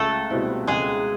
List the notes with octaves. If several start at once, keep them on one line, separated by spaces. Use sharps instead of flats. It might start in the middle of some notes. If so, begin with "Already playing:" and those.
Already playing: C#2 A3 A4
B2 G3 C4 E4
C#2 G#3 G#4